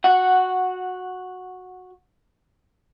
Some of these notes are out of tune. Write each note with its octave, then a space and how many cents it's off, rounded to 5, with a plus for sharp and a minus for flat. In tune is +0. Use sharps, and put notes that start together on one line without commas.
F#4 -10 F#5 +0